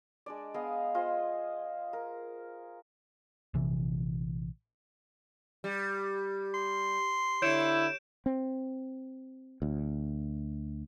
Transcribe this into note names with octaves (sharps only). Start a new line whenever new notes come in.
G#3 D4 D5
B3 G#4 D#5 F5
F4 G#4 C5 D#5
A#4
A#1 C3 E3
G3
C6
D3 E4 C#5 G6 D7 E7
C4
D2